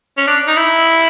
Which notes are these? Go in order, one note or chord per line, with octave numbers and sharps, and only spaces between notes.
C#4
D4
D#4
E4